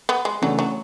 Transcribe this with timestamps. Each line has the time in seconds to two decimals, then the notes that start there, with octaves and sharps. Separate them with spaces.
0.09 B3
0.25 G#3
0.42 C#3 E3 F#3 A3 D4
0.59 F#3